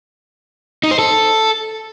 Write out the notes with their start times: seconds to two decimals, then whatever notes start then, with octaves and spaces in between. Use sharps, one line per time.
0.83 D#4
0.91 C5
0.99 A4